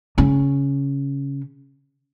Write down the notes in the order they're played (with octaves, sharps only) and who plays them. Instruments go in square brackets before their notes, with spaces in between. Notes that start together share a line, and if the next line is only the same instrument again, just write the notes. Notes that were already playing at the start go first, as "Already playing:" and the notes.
[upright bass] C#3 C#4